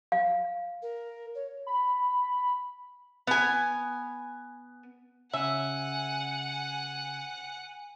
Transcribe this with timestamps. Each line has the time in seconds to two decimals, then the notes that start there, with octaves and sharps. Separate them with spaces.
0.12 F5
0.82 A#4
1.35 C#5
1.67 B5
3.27 B3 G#5
5.33 C#3 E5 F#5 G#5